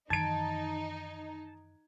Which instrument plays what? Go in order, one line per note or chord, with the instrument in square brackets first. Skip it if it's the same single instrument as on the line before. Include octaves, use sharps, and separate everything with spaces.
[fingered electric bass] F#2 D#3 E3 [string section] D#4 [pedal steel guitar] A5 [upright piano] G#6 D7